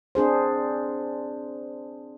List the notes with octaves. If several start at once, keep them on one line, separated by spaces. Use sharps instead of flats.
C4 D4 G#4 C5